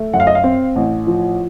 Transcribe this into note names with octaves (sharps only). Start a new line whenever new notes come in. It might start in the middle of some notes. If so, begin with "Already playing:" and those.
Already playing: A3
F#2 F#5
F5
D#5
F5
C4
A1
F3